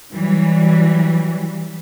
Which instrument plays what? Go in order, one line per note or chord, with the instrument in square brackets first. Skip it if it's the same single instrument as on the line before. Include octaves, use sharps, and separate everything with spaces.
[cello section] E3 F#3 G3